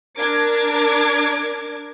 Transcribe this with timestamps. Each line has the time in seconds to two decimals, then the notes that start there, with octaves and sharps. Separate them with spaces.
0.17 D4 A#4 D6 G#6